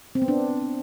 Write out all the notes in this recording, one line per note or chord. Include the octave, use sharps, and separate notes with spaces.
C4
B3
D4